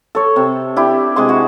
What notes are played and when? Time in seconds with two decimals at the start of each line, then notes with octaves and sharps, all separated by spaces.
0.15 A4 C#5
0.36 C3
0.76 D4 E4 G4
1.16 C3 G#3 G#4 C6
1.29 F#4